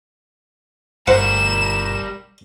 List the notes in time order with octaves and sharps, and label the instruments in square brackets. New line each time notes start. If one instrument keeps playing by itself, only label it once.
[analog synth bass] G1 [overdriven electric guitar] G3 A#4 [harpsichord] C5 F#5 [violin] E7